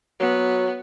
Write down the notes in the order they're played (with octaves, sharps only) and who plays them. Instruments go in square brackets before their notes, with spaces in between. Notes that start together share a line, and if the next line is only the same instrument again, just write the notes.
[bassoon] F#3 [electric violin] B3